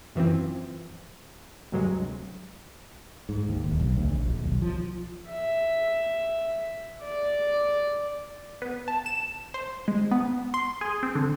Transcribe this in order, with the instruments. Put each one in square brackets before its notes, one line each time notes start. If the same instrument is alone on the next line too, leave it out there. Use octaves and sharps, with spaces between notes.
[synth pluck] F#2 E3 F3 C4
D2 G2 C3 F#3 G#3
[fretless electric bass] G#2
D#2
D1
B1
D2
A#1
D#1
B1
F3
[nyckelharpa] E5
D5
[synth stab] B3
A5
E7
C5
G#3
B3
C6
G#4
C4
D3